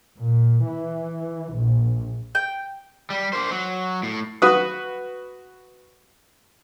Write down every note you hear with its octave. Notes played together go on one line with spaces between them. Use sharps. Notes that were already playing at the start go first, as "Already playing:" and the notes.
A#2
E3
A#1
G5
G3
A#3 C5
F#3
A2
F#4 B4 D#6